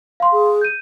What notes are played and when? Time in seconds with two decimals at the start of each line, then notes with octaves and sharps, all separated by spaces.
0.20 F5 C6
0.32 G#4
0.61 G6 D#7